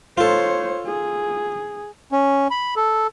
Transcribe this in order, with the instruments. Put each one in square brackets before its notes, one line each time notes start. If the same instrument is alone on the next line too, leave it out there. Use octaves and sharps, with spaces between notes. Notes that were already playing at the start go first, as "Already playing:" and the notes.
[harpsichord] F4 A4 [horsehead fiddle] C5 C#5
[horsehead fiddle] G#4
[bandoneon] C#4
B5
A4